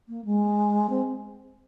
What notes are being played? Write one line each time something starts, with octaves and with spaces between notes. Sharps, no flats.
A#3
G#3
C4